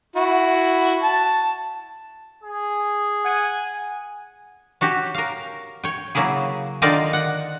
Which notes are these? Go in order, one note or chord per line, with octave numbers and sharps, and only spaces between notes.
E4 F#4
A5
G#4
F#5 G#5
C#4 F#4 G4
A#4 F5
C#5 G5
C#3 F#3 A#3 E4 G#4
D3 D#3 D#4 F4 A#4 D5
F#5